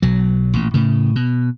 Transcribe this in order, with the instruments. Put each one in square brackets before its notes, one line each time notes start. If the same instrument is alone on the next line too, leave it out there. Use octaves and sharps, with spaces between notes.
[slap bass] B1 F#3
A1 A#2
A2 C#3
B2